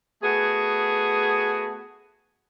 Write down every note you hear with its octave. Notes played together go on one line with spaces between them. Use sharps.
A3 B3 F#4 G#4